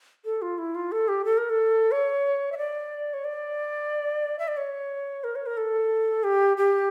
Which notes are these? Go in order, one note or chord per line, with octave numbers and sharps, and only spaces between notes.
A4
F4
E4
F4
A4
G4
A4
A#4
A4
C#5
E5
D5
C#5
D5
E5
D5
C#5
A#4
C#5
A#4
A4
G4
G4